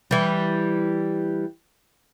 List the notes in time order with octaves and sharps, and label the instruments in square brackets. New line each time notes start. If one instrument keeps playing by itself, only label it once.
[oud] E3 G3